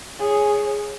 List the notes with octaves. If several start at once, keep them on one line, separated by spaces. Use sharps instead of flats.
G#4 C#5